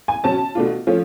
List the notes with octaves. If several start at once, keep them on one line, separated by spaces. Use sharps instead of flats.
G#5
B2 F#3 C#4 A5
B2 A3 D4 F4
F3 A3 C#4 F4